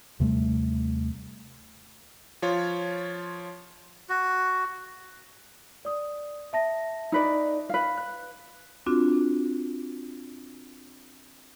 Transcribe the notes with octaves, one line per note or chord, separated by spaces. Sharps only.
D#2 C3 G3 A3
F3 F4 C#5
F#4
D5 D#6
E5 A5 A#6
D#4 B4 D5
B4 F5
F#6
C4 D4 F4 F#4